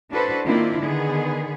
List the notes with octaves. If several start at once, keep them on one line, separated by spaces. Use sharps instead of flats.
D4 E4 F#4 A4 B4 C5
D#3 A#3 C4 D4 E4 F4
D3 D#3 B3 G#4